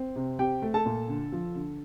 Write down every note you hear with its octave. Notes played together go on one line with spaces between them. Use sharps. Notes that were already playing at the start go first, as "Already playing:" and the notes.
Already playing: C4
C3
C4 G4 G5
A3
A4 A5
A#2
D3
F3
D3